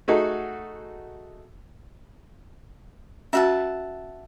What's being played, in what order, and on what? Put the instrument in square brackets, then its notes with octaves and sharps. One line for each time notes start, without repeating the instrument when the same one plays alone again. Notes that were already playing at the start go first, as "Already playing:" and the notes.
[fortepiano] A3 D#4 F#4 G#4 A4
[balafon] C#4 F#4 [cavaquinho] E5 F#5 A5